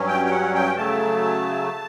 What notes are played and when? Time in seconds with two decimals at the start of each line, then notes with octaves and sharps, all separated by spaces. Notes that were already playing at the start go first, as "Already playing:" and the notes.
Already playing: G2 F#3 C#4
0.08 G5
0.26 G5
0.31 F#5
0.55 G5
0.77 C#3 F#3 A3 A5